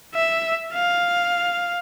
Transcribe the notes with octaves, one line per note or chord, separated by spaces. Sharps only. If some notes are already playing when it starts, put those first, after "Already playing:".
E5
F5